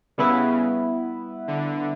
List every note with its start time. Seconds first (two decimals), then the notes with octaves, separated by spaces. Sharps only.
0.18 C#3 G3 B3 E4 B4
1.48 D3